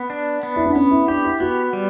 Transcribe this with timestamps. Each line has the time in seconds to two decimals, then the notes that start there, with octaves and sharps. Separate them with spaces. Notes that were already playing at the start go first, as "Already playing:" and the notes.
Already playing: B3
0.10 D4
0.43 B3
0.56 E4
0.66 D4
0.75 B3 C#4
0.91 E4
1.08 D4 G4
1.25 E4
1.40 B3 F#4
1.73 G3